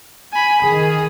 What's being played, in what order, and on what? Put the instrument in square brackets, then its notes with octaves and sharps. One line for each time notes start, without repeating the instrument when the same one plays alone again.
[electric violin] G#5 B5
[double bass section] D#3 [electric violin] G#4